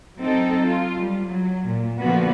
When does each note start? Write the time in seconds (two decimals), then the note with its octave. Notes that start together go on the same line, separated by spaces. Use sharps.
0.20 F#3 C4 D#4 A4
0.64 F4
0.95 G3
1.25 F#3
1.66 A#2
1.99 D3 F3 A#3 B3 F#4